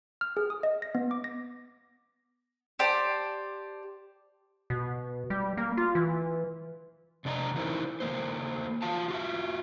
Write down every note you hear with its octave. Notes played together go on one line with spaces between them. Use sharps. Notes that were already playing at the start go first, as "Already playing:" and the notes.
F6
G#4
D#6
D#5
A#6
B3
D6
A#6
G4 C5 D5 A5
B2
G3
A#3
F4
E3
C3 D4 D5 D#5 A#5
D#3 E3 D#4 E4 A#4 C5
D#3 A3 A#3 C5
D#3 F4 F5 A5
F4 F#4 E5